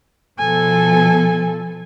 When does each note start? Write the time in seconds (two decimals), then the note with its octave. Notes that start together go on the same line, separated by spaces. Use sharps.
0.39 B2 F3 A4 G#5